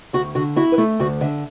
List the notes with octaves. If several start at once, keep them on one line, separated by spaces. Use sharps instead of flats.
D2 F#4
D3 F#4
E4 F#4
B4
A3 A4
D2 F#4
D3 E5